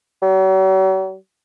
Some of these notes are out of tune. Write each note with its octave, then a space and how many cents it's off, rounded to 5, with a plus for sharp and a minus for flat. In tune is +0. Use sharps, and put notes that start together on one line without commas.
F#3 +45